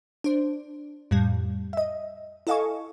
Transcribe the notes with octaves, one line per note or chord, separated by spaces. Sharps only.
D4 C5
F2 A2 G3
D#5 E5
E4 A4 D#5 F5 G#5 C#6